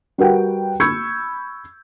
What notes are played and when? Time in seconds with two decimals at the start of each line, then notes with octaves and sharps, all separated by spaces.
0.18 G3 F#4 A#4 B4 F#5 G5
0.80 B5 C#6 E6 G6 G#6 C#7